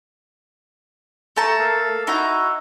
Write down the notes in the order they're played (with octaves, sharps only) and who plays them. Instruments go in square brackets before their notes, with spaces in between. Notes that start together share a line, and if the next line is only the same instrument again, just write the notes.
[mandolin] A3 A5 A#5
[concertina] A#3 A4 F5
[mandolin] D#4 A#5 [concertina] E4 F#4